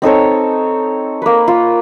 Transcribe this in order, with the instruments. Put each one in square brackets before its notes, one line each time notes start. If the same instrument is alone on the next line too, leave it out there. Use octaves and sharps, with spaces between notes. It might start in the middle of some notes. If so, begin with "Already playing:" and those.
[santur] C4 D#4 A4 C#5
A#3 B4
F4